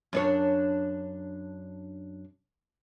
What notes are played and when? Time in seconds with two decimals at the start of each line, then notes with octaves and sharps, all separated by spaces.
0.13 F#2 D4 C#5